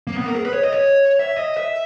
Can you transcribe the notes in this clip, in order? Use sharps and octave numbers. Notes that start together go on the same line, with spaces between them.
A#3
B3
A#4
G#4
B4
C#5
D#5
C#5
E5
D#5
E5